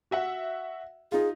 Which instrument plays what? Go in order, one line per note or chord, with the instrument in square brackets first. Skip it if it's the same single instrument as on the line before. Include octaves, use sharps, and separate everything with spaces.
[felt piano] F#4 E5 F#5
[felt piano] D#4 F4 [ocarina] G#4